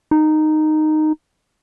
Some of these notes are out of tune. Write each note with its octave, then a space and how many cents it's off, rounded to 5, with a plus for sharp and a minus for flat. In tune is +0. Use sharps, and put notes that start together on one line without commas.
D#4 -10